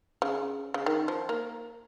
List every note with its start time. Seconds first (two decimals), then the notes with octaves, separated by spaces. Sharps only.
0.22 C#3
0.74 C#3
0.86 D#3
1.08 F3
1.29 A#3